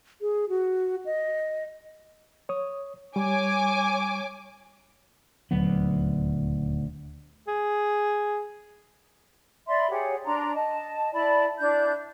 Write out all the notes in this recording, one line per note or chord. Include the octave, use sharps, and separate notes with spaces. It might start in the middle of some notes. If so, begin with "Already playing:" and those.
G#4
F#4
D#5
C#5 D#6
G3 C#5 G#5 D6
D#1 D2 F#3 B3
G#4
D5 E5 B5 C6
G4 G#4 C#5 F#5
D4 A#5 C6
D#5 A5
E4 D5 A5 B5
D4 E4 D5 G6